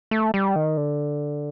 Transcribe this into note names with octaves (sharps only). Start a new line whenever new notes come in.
A3
G3
D#3
D3